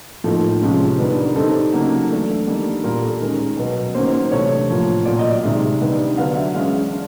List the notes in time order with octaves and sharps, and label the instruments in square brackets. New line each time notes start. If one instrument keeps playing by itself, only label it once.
[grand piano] A2 F3 A#3 D#4 A4
C3 F3 G#3 C#4
D#3 G3 B3 D4 B4
A#4
D#3 G3 C4 D#4 A4
C#3 F#3 A#3 D#4
E3 A3 D4
D#3 G3 A#3 D4
A#2 G3 A#3 A#4
A4
D#3 G#3 C#4 A#4
B2 F#3 B3
D#3 F#3 A#3 C#4 C5
C5
C3 E3 A3 D4 C#5
A2 F3 A#3
A#2 F#3 A#3 D5
D#5
D5
C3 D#3 G#3 E5
D#3 G3 B3 D4
D3 F#3 B3 D4 F5
E5
E3 G#3 C#4 F5
D4